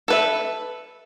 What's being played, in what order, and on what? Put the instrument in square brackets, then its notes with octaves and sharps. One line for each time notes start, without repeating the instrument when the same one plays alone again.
[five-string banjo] A4 B4 E5